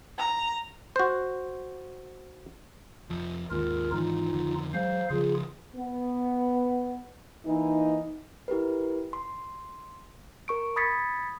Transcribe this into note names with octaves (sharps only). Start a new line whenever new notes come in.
A#5
F#4 C5
F1 F3
D#2 G#2 D#3 F4 A#4
G#2 D#3 E3 D#4 F4
F2 D3 D#3
F#3 G#3 C5 F5
C#3 F3 F4 G#4
B3
E3 A#3 D#4
E4 G4 A#4 B4
C6
A#4 C#6 D7
B5 D#6 G#6 A6 B6 C#7